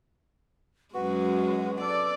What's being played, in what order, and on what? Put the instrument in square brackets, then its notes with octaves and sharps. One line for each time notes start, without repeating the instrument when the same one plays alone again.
[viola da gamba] F#2 G#3 [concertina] F#4 [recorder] B4
[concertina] A4 [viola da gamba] D5